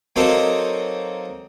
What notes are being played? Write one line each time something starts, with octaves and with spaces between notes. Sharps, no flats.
F#3 A#3 C4 D#4 A4 C5